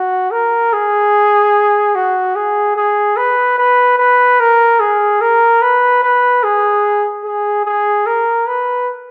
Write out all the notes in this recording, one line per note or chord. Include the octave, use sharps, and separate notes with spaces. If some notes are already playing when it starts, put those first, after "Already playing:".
Already playing: F#4
A#4
G#4
F#4
G#4
G#4
B4
B4
B4
A#4
G#4
A#4
B4
B4
G#4
G#4
G#4
A#4
B4